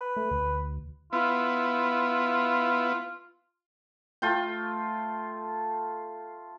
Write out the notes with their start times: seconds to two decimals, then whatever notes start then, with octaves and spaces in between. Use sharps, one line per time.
0.01 B4
0.17 A3
0.31 D2
1.13 B3 E4 F4
4.22 A3 F4 G5